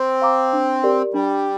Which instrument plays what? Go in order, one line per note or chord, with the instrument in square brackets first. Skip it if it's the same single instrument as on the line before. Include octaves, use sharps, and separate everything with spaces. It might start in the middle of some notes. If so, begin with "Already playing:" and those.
Already playing: [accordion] C4
[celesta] F5 A#5 D6
D4
G4 A#4 D5
[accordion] G3 [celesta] D4